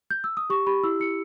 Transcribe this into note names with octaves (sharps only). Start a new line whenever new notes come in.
G6
E6
D#6
G4 C#6
G4 B5
E4 E6
E4 C#7